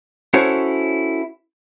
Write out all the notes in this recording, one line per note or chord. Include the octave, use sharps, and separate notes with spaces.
C#4 E4 F#4 A4 C5 C#5